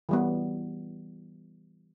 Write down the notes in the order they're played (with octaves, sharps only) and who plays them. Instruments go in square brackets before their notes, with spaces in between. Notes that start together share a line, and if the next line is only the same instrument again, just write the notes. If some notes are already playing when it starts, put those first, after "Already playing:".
[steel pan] E3 G3 B3